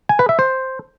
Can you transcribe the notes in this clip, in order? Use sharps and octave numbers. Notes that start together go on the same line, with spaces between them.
G#5
B4
E5
C5